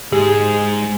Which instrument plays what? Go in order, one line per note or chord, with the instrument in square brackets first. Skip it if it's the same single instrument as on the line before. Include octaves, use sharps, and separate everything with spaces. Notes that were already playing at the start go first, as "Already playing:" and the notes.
[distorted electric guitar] G#2 G#3 [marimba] G4 [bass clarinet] G#4